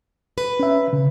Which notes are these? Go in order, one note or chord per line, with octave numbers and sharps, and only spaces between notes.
B4
C#4 E5
C#3